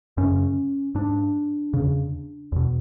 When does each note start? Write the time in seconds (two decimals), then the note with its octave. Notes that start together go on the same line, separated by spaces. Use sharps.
0.17 F#2 C#3 C#4
0.95 G#2 D4
1.74 E2 C#3
2.52 E2 B2